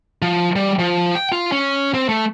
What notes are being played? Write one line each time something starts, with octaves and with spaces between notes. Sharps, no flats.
F3
G3
F3
G5
F4
C#4
C4
A3